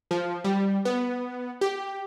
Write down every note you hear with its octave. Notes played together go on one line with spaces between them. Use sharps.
F3
G3
B3
G4